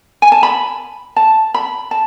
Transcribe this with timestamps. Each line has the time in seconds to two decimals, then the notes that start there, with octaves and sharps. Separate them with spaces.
0.22 G#5
0.32 A5
0.43 B5
1.16 A5
1.54 B5
1.91 A5